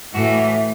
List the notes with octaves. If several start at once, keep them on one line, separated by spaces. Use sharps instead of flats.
A2 E3 A3 F#4